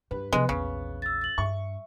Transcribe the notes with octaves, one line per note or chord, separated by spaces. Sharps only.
G2 B4
C3 F3 G#3 B3
A#1 E2 C#3
E6 A6
A6 F#7
G2 E5 C#6